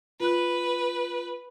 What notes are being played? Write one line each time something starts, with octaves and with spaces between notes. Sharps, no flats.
F4 B4 F#6